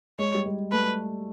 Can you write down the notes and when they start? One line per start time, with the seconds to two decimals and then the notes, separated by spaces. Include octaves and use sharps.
0.19 G#3 C#5
0.34 G3
0.45 G#3
0.72 A3 B4